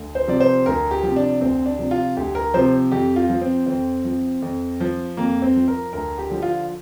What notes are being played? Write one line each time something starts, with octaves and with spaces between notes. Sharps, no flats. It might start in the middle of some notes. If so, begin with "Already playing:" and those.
Already playing: D2
C5
C3 F3 D5
C5
D2 A#4
G4
C3 F3
D4
D2 C4
D4
C3 F3
F4
D2 G4
A#4
C3 F3 C5
F2 G4
F4
F3
C4
F2 C4
F3
F2
F3
F2 A#3
C4
F3
A#4
D2 A#4
G4
D3 F3
F4